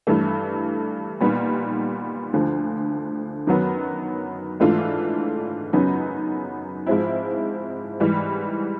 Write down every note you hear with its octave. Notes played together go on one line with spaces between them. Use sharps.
G2 E3 A3
A#2 G3 B3 D#4
D2 D3 F3
F#2 D#3 F#3 B3
G#2 E3 A3 D4 F4
F#2 C#3 F#3 B3 D#4
G#2 F3 G#3 C4 E4
G#2 E3 G3